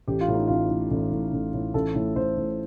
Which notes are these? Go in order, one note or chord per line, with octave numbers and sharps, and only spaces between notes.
A1 G4
F4
A2
D#4
A1 F4
A2
A1
A2
A1
A2
A1 A4
A2
A1 C5
A2